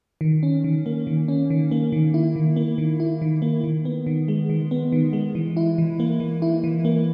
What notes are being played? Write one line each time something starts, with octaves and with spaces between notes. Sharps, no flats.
D#3
C#4
D#3
A#3
D#3
C#4
D#3
A#3
D#3
E4
D#3
A#3
D#3
E4
D#3
A#3
D#3
B3
D#3
G#3
D#3
B3
D#3
G#3
E3
E4
E3
A#3
E3
E4
E3
A#3